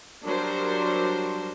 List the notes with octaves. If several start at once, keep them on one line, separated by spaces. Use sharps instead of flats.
F#3 G3 D4 A#4 C5